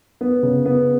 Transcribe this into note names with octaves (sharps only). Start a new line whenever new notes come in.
B3
C#3
B3